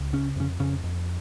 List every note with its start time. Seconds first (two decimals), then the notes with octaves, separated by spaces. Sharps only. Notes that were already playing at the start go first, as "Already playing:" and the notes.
Already playing: C#2
0.13 C#3 C#4
0.36 F2 C#3 C#4
0.60 F2 C#3 C#4
0.84 F2